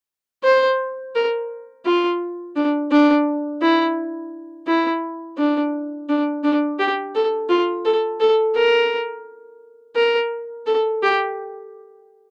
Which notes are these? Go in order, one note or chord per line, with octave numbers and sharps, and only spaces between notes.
C5
A#4
F4
D4
D4
E4
E4
D4
D4
D4
G4
A4
F4
A4
A4
A#4
A#4
A4
G4